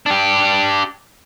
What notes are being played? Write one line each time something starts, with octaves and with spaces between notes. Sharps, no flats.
D4 G4